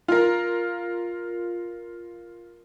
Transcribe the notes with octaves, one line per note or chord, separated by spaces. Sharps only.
F4 A#4